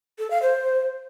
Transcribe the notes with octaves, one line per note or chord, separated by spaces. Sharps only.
A4
F5
C5